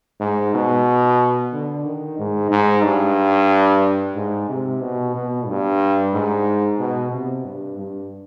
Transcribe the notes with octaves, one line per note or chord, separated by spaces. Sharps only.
G#2
B2
D3
D#3
G#2
G#2
G2
G#2
C3
B2
B2
G2
G#2
B2
C3
G2
G2